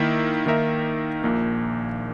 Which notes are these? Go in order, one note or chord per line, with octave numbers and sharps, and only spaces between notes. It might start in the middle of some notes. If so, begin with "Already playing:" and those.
Already playing: D#3 A#3 E4 A#4 E5
D#3 A#3 D#4 A#4 E5
A#1 A#2 A#3